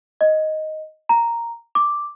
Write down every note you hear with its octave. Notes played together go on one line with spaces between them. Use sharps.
D#5
A#5
D6